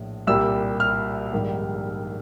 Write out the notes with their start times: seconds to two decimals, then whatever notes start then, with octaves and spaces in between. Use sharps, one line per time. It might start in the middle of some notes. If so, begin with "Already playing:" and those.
Already playing: A#1 A2
0.27 C2 A#2 G3 E6
0.80 F6
1.32 A#1 G#2 D#3 G3